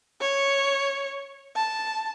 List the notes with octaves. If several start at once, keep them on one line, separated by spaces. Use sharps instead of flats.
C#5
A5